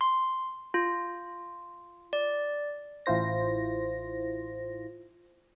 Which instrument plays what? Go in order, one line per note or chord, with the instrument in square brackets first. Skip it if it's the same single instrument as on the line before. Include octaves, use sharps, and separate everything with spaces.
[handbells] C6
F4
D5
[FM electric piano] A1 E4 F4 C5 A#6